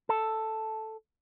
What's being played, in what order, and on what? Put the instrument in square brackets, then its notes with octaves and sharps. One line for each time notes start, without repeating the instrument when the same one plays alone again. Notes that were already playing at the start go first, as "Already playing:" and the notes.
[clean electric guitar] A4